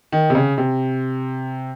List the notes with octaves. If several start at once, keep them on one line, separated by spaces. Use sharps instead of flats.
D#3
C3
C#3
C3